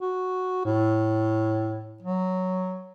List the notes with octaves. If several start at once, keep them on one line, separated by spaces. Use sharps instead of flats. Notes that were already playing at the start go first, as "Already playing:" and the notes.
F#4
A2
F#3